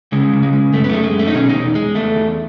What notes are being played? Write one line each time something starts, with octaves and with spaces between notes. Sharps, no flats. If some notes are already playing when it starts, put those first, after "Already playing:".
C#3 G#3
C#3
G#3
G#3
F#2 A3
B3
G#3 A3
G#3
F#2
A3
D#4
B2 C#4
E2 D#4
G#3
E2 A3
E2